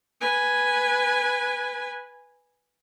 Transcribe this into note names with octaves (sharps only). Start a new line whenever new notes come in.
B4 G#5